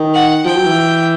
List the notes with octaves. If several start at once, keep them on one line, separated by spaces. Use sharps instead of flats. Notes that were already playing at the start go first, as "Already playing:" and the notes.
Already playing: D#3
F#5
F3 G5
F#3
E3